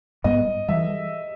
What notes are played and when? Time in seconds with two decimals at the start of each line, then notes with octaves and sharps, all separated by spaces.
0.24 G#2 G3 B3 D#5
0.69 E3 G3 E5